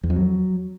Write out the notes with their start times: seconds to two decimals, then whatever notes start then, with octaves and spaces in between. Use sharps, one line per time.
0.03 E2
0.10 F2
0.16 F#3